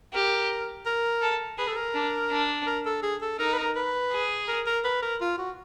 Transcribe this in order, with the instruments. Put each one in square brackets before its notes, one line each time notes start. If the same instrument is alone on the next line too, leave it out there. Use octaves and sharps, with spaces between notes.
[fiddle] G4 [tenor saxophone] A#4
[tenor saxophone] A#4
[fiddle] A4
[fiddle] G#4 [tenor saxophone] B4
[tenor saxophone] A4
A#4
[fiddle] D4
D4
[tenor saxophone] A#4
A4
G#4
A4
[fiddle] D#4 [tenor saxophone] A#4
[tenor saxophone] B4
A#4
B4
[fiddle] G#4
[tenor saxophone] A#4
A#4
B4
A#4
F4
F#4